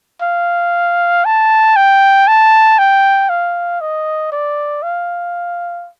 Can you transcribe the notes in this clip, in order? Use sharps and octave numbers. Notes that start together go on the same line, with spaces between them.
F5
A5
G5
A5
G5
F5
D#5
D5
F5